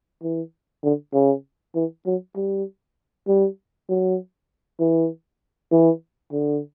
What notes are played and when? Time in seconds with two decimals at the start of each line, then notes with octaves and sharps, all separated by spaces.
0.23 E3
0.83 D3
1.13 C#3
1.75 E3
2.06 F#3
2.36 G3
3.28 G3
3.89 F#3
4.80 E3
5.71 E3
6.32 D3